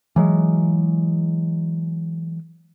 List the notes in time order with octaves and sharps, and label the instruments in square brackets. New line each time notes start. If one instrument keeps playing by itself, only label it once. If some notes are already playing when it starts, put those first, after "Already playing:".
[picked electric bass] E3 F#3 G#3